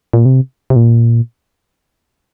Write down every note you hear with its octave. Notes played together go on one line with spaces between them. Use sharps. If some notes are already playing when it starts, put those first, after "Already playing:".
A#2
C3
C3
A#2